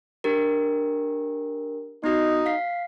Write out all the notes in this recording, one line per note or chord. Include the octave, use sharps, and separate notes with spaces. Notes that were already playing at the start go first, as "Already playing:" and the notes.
D4 G4 A#4
B3 D#4 F#4
F5 B6 C7